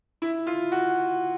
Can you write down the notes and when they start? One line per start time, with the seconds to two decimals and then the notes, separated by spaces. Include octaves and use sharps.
0.22 E4
0.47 F4
0.72 F#4